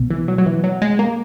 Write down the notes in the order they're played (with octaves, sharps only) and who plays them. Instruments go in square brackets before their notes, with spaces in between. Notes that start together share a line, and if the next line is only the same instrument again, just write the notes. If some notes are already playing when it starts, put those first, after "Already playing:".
Already playing: [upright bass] B2
[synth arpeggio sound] E3
F#3
F#3
E3
F#3
G#3
A#3